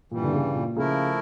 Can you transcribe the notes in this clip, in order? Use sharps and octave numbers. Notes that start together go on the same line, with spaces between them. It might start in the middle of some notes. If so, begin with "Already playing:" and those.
G2 A#2 E3 G3
D3
C#3
A#2
C#3 F3 A3 E4 A#4